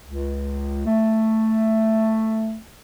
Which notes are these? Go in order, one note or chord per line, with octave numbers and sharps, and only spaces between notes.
C#2
A3